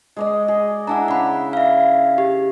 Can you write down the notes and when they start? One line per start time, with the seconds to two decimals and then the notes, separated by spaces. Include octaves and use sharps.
0.16 G#3 D5 D#5
0.48 G#4
0.87 D4 E4 E5 F#5 G#5 A#5
1.08 C#3 F#5 B5
1.53 E5 F5
2.18 G4